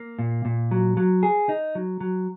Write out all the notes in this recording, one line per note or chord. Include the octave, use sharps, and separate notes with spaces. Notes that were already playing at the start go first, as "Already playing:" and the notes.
Already playing: A#3
A#2
A#2
F#3
F#3
G#4
D#4
F#3
F#3